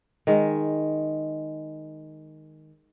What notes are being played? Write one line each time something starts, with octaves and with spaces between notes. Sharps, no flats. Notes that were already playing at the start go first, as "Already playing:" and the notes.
D#3 G#3